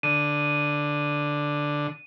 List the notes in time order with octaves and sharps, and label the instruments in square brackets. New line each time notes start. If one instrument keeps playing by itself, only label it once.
[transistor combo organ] D3 [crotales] D#7